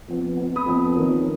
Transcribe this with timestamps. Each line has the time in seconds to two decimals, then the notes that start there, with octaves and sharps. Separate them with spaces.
0.08 F2 F3 B3
0.37 F2 F3 B3
0.56 B5 D#6
0.66 F2 F3 B3
0.95 F2 D#3 A#3 C#4